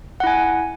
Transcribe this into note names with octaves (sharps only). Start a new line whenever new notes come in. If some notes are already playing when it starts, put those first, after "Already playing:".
E4 F#5 G#5